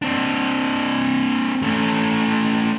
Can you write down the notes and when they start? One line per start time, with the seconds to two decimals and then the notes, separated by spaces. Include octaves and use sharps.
0.02 C4 D4
1.62 A3 C#4